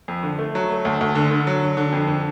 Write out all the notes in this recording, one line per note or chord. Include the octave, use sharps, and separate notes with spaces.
F2
D3
A3
F#3
A3
D2
D2
D3
D3
F#3
D3
D3
F2
D3